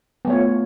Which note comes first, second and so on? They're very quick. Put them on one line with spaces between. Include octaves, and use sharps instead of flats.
B3 A3 C#5 F4